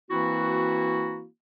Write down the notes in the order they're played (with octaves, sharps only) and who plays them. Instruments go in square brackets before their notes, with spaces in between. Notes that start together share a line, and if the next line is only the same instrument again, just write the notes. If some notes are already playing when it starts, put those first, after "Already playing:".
[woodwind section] E3 A#3 C4 E4 F#4